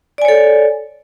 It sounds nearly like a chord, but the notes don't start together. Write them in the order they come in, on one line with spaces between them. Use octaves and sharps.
D5 G#5 C#5 A4